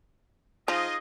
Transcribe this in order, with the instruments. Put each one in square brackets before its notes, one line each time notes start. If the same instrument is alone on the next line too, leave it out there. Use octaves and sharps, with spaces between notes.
[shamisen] F3 [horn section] D#4 F4 G#4 [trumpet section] D#5